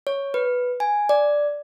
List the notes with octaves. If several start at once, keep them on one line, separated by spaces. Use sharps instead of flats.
C#5
B4
G#5
D5